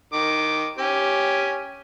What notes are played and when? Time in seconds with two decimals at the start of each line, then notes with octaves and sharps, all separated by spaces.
0.13 D#3 D6
0.78 C#4 G4